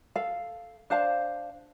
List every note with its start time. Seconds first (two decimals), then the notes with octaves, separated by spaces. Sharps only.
0.16 A4 F5
0.90 D4 C5 F5 A5